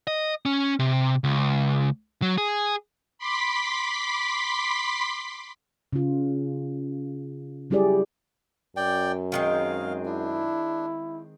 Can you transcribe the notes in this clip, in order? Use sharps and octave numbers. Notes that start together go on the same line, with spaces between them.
D#5
C#4
C3
C#2
F#3
G#4
B5 C6 D6 B6
C#3 F4
F#3 G3 E4 G4 G#4 D5
F#2 D5 G5
D#3 G#3 C4 F5
D4 E4